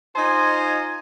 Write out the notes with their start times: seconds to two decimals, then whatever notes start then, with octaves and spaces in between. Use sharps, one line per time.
0.15 D#4 F4 C5 D#5 G#5